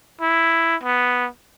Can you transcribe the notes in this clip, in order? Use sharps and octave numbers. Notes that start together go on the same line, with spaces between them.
E4
B3